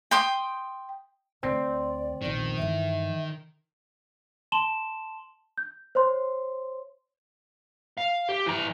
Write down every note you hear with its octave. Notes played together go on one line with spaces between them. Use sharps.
G5 C6 D#6
D2 C4 D5
A#1 E2 D#3
G2 E3 E5
A5 C6 E7 F#7 G7
G6
C5 C#5 C6
F5
G4
E3 A#5